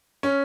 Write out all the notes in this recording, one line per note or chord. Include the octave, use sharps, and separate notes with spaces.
C#4